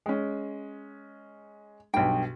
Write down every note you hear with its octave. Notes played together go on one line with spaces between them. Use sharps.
G#3 C#4
B1 G2 G5